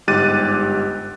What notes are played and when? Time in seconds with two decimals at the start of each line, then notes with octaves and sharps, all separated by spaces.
0.07 G1 G#2 G4 F#6 A6 D#7